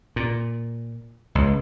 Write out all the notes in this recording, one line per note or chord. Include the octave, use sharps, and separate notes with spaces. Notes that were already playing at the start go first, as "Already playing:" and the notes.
A#2
C#2